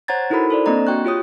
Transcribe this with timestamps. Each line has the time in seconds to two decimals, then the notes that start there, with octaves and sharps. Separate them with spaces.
0.08 C5 C#5 F#5 A#5 G#6 A6
0.30 D#4 E4 F#4 A4 A#4 B5
0.50 A4 C5 D5
0.66 A#3 C4 D4 D#5 A#5
0.87 F#4 G5 C#6 F#6
1.05 F4 G4 C#5 D#6